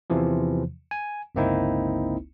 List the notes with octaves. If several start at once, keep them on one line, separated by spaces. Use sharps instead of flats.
E2 C3 E3 F3
G#5
G1 C#2 A#3 C4 D#4 E4